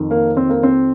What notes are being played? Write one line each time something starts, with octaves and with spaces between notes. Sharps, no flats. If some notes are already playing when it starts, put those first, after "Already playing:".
Already playing: F2 D#3
A#3
C4
A#3
C4